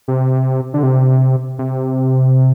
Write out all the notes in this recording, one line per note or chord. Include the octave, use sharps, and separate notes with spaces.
C3
D3
C3
C3